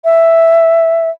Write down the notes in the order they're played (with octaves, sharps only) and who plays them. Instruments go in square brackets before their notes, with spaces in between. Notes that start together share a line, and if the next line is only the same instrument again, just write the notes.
[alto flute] E5